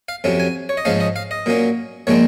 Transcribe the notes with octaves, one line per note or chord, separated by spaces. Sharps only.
F5
F2 C3 F#3 C#4
G#5
C#5
D#5
G#2 F3 G#3 C#4 F5
D#5
F5
D#5
A#2 F#3 A#3 C#4
A#2 F3 G#3 C4 C#5